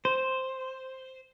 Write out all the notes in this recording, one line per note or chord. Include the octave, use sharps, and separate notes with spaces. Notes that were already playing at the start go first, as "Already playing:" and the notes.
C5